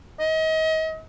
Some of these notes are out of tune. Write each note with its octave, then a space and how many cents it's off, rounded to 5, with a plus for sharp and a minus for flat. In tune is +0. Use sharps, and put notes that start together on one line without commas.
D#5 +35